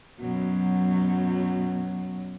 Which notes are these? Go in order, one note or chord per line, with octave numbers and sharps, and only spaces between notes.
F#2 B2 F#3